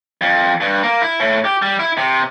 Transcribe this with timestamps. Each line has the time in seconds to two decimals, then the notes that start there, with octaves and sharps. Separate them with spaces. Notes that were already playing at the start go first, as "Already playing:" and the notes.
0.21 F2
0.61 G2
0.83 A#3
1.02 E4
1.20 A2
1.45 G4
1.62 G3
1.80 E4
1.97 C3